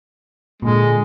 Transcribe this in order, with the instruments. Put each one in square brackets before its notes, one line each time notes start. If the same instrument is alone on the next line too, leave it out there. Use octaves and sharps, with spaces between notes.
[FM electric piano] A#2 D3 [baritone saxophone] G#3